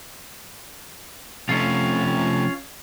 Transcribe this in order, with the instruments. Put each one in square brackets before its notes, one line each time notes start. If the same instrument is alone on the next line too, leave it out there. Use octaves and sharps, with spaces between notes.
[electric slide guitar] C3 F3 A3 [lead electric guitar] C#4 F4